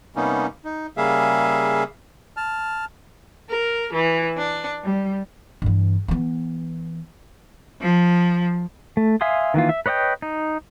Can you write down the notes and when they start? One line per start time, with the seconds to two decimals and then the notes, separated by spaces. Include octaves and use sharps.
0.16 C3 G3 A#3 B3 C#4 D#4
0.65 D#4
0.97 C#3 G3 A#3 G#4 E5 F5
2.37 A5 F6
3.49 A#4
3.93 E3
4.37 D4
4.84 G3
5.62 G2 E3
6.08 E3 B3
7.81 F3
8.97 A3
9.21 E5 F5 G#5 C6 D#6
9.54 D#3 E3 A#3 F4
9.69 E5
9.86 B4 C#5 D#5 F#5 G5
10.22 D#4